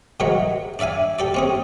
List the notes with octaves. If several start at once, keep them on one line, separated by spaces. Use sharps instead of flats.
G#2 D#3 E3 F#3 C#5
D4 D5 E5 F5 G#5
G4 A4 D5
C4 C#4 G#4